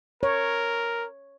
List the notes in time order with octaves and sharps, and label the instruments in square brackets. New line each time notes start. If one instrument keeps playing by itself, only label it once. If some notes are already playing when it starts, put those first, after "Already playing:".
[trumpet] A#4 [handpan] C#5